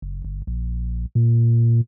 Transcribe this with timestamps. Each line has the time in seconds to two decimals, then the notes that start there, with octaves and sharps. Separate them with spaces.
0.02 F#1
0.24 G1
0.47 A#1
1.15 A#2